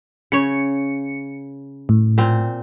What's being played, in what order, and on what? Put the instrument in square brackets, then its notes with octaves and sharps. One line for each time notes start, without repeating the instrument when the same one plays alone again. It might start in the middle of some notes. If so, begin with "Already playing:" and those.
[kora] C#3 C#5 [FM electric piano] C#7
[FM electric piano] A2
[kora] A#2 C4